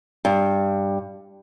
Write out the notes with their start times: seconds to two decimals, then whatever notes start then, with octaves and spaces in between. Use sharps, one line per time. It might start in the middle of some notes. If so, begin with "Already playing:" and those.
0.25 G2